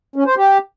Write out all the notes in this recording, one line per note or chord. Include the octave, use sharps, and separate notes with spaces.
C#4
C5
G4